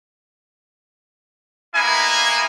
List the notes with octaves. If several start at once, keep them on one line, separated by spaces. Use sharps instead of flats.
A#3 B3 E4 D#5 G#5